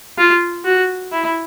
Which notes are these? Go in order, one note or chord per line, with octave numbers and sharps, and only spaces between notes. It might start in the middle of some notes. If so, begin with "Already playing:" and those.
F4
F#4
E4